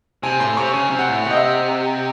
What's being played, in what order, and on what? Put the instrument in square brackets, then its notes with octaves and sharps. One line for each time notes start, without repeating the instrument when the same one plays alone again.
[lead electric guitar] C3 [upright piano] G#5
[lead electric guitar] A2 [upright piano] C6
[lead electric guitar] C3 [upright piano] C#6
[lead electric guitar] C#3 [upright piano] G#5
[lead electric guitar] C3
[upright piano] F#5
[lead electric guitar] A2
[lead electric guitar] C3 [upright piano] F#5
[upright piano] D#5
E5